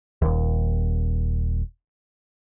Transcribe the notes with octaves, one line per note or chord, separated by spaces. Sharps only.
D#1 D#2